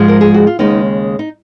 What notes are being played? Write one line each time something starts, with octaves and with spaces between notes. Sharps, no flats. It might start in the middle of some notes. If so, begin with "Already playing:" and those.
Already playing: G#2 F3 G#3
A#4
G#4
F#4
F4
D#2 C#3 G#3 B3 D#4
D#4